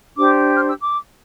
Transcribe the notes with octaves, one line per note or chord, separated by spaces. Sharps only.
D4 G4 C5 D6
F6
E6
D6